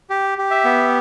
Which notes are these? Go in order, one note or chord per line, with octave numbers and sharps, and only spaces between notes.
G4
G4
E5
B3